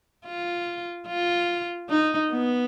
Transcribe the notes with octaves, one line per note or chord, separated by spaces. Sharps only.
F4
F4
D#4
B3